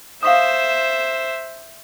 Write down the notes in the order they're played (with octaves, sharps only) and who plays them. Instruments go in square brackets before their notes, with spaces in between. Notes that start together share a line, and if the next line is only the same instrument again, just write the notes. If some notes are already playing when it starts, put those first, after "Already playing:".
[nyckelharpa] C5 E5 [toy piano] F5 C#6 D#6